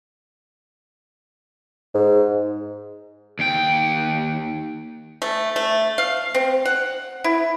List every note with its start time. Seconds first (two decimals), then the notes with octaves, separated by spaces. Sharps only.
1.95 G#2
3.39 D#2 G5
5.22 A3
5.56 A3
5.98 F5
6.34 C4
6.65 F#5
7.24 E4